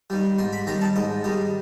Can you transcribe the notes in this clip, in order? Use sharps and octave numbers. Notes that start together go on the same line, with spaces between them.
D#3 G3
G#2 C6
B5
D#3 G3 A#5
A5
G#2 D#5
D#3 G3 D#5